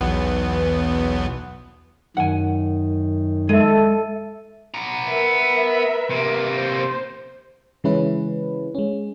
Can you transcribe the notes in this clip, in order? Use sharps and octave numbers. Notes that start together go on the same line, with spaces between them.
B1 E2 B3
F#2 D#3 F#5 G#5
G#3 A4 E5 D#7
B3 A#5
A#4 B4 E5
C3 A#3
C5
C#3 E3 G#3 C#4 E4 B4
G#3 C#4